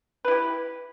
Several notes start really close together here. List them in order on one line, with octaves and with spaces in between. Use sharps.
B4 E4 G4